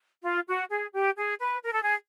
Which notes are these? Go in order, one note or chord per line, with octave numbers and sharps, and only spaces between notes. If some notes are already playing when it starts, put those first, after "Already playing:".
F4
F#4
G#4
G4
G#4
B4
A#4
A4
G#4